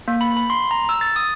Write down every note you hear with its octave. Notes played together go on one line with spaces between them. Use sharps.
A#3
B5
B5
C6
A#5
E6
A6
D#6